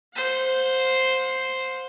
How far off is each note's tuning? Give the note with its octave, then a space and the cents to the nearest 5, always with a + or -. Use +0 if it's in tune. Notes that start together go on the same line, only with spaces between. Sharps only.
C5 +0 F#5 -45